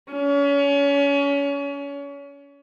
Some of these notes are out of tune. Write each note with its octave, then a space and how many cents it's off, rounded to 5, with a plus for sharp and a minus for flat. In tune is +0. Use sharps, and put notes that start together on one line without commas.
C#4 +30